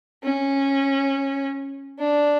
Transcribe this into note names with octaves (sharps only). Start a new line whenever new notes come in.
C#4
D4